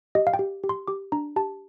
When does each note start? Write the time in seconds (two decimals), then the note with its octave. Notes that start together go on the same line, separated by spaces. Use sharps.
0.15 G4 D#5
0.27 F5
0.34 G5
0.39 G4
0.63 G4
0.69 C6
0.88 G4 D6
1.12 D4 A#5
1.36 G4 A5